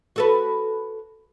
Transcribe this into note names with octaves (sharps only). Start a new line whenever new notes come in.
F#4 A4 B4